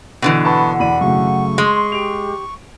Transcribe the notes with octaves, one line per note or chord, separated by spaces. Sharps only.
B2 D3 E3
B3 F#5 A5 B5 C#6
E2 D5 B5 D#7
F#2 C#3 A3 C#6
G#3 C6
G4 D7 F7